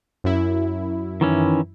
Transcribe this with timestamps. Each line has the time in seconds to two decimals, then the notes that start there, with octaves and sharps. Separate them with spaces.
0.24 F#2 E4
1.21 D#3 E3 C#4